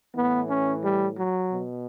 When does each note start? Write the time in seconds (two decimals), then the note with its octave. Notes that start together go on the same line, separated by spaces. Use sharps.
0.16 A2 E3 B3
0.49 C#4
0.83 G3
1.17 F#3
1.51 B2